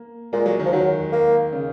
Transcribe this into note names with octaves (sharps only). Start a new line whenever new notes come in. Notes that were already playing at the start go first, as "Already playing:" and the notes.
Already playing: A#3
A#2 G#3
F#3
D#3
F3
D#3 F#3
A#3
C#3